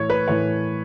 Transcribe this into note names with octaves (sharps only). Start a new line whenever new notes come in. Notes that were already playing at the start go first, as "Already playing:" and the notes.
Already playing: A2 E3 A3 C#5
B4
A2 E3 A3 C#5